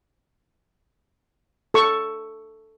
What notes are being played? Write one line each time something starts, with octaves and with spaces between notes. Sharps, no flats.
A4 C#6